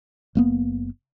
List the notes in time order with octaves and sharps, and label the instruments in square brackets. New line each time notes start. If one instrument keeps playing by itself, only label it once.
[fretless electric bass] F#1 A#3 B3